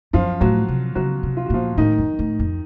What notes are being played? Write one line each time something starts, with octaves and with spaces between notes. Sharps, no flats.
F#2 F3 F4
A2 F#3 F#4
C3
C#3 F#3 F#4
C3
F4
F#4
A#2 F3 F4
A2 D#3 D#4
F#2
A2
F2